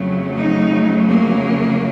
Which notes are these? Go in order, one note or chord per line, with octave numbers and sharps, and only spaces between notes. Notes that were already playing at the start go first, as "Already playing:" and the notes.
Already playing: F2 C#3 F#3 A3
D#4
A#3